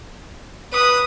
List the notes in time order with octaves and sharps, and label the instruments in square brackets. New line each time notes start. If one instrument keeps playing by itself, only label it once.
[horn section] B4 [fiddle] D#6